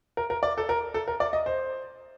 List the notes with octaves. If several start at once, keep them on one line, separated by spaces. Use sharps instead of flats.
A#4
A#4
D5
A4
A#4
A4
A#4
D5
D#5
C5